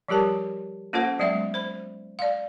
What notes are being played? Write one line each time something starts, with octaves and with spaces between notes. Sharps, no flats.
F3 G3 G4 A#4 A5
A#3 C#4 F4 A4 C5 F#5
F#3 G#3 B3 D5 E5
C5 B5
D5 F5